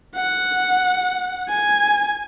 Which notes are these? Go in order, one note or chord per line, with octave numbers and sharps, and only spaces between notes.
F#5
G#5